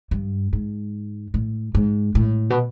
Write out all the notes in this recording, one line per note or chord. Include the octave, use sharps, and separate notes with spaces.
G2
G#2
A2
G#2
A2
B2